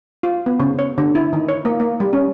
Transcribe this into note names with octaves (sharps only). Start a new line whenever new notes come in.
F4
B3
C#3
C#5
D3
E4
D#3
C#5
A#3
A#3
G3
C#4